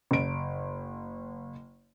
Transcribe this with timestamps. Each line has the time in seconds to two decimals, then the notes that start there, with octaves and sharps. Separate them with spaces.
0.11 F#1 D7